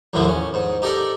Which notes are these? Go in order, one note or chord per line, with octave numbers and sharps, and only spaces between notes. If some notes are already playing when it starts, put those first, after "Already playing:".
A1 D#2 A2 D3 E3 F3
C#4
G#2
D#4 G4 A4 A#4 D5